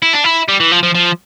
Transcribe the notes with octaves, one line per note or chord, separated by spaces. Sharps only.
E4
D4
E4
G3
E3
F3
F3
F3